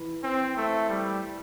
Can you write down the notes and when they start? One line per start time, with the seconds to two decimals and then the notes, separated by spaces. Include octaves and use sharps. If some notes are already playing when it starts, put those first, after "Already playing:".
Already playing: E3
0.24 C4
0.57 A3
0.89 G3